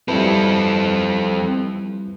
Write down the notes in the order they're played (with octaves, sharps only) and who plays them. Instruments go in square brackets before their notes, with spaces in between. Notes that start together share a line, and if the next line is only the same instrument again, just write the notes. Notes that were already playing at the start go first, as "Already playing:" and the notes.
[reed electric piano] G3 E4 B4 [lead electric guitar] C4 A4